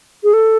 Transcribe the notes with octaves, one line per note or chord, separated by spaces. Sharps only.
G#4
A4